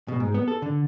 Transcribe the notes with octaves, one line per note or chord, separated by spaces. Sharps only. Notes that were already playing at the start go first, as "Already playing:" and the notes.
B2
G#2
B3
A4
D3